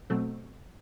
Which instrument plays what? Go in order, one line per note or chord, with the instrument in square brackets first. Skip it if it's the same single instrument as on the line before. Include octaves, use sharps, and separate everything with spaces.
[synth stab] B2 F#3 A3 C4